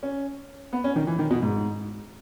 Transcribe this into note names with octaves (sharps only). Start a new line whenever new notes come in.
C#4
B3
C#4
D#3
E3
D#3
B2
G#2